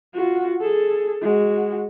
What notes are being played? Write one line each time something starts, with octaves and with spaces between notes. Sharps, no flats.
F4 F#4
G#4 A4
G#3 F#4